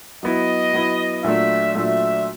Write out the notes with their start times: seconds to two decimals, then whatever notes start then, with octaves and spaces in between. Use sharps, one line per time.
0.23 F#3 B3 E4 D#5
0.73 F#3 B3 E4
1.24 A#2 F#3 A3 D4 E5
1.74 A#2 F#3 A3 D4 E5